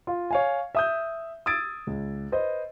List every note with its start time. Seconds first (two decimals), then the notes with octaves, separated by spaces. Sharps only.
0.07 F4
0.31 C#5 F5 G#5
0.75 E5 D#6 G6
1.46 D#6 E6 G#6 A6 D7
1.87 C#2
2.32 B4 C5 D#5